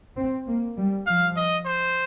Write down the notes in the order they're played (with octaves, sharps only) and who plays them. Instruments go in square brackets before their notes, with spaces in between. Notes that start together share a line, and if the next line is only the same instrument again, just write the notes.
[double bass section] C4
A#3
G3
[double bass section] F3 [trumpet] F5
[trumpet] D#5
C5